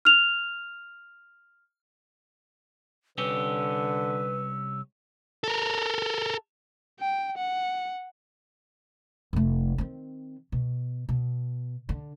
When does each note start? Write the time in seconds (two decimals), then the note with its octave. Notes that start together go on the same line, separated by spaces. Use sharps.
0.05 F6 F7
3.18 C2 D3 C#4 G4 B4 E6
5.44 A4 A#4
7.00 G5
7.37 F#5
9.33 F1 A3
9.78 D#3 C4
10.52 B2
11.09 B2
11.89 D3